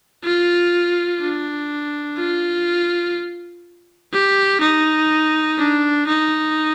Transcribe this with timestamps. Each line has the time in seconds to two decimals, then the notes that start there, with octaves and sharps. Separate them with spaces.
0.24 F4
1.20 D4
2.17 F4
4.13 G4
4.61 D#4
5.58 D4
6.07 D#4